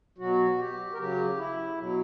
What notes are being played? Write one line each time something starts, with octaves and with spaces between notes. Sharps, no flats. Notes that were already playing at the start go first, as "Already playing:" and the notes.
B2 F#3 F#4
G4
A#4
C#3 F#3 G4
E4
B2 F#3